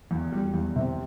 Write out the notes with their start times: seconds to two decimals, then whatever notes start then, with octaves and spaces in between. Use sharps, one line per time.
0.11 E2
0.32 G3
0.54 E2
0.76 C3